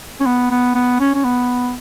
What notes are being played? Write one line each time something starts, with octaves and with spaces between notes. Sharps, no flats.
C#4
B3
B3
B3
C#4
C#4
B3